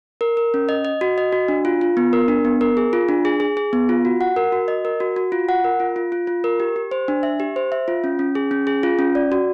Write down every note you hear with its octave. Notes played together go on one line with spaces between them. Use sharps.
A#4
A#4
C#4
D#5
D#5
F#4
D#5
F#4
D4
F4
F4
B3
A#4
D4
B3
A#4
G#4
F4
D4
G#4
G#4
G#4
B3
F4
F#4
F#5
A#4
F#4
D#5
A#4
F#4
F#4
F4
F#5
A#4
F4
F4
F4
F4
A#4
G4
G4
C5
D4
E5
G4
C5
E5
F4
C#4
C#4
G#4
C#4
G#4
F4
C#4
D5
F#4